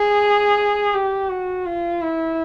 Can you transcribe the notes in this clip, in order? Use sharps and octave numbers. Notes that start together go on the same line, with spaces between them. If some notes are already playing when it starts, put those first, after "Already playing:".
Already playing: G#4
G4
F#4
F4
E4